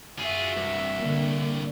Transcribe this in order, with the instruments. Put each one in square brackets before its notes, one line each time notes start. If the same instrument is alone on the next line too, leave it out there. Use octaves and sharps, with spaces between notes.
[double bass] F#2 [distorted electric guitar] F4 G#4 [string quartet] F#4 E5
[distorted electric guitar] C2 G2
[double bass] D3 A#3